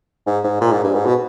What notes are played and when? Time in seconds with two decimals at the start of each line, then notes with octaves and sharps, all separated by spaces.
0.27 G#2
0.44 G#2
0.61 A#2
0.73 G#2
0.84 G2
0.95 G#2
1.06 B2